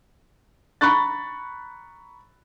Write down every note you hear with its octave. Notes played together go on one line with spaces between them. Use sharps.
A#5 B5 C#6 F#6 A6